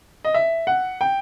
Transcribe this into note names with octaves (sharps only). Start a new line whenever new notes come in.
D#5
E5
F#5
G5